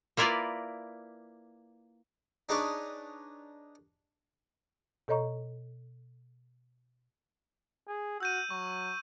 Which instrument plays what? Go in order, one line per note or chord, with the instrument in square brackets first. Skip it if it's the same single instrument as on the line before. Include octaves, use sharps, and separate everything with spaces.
[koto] A#3 E4 F4 A#4 B4 D5
[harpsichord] D4 D#4 G#4 B4 C#5 D5
[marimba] B2 A4 C#5 D#5 A#5 C#6
[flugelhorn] G#4
[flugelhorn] F#4 [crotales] E6 G6 D#7
[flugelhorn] F#3 [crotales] C#6